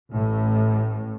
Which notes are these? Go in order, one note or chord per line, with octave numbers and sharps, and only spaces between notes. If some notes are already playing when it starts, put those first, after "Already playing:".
A1 A2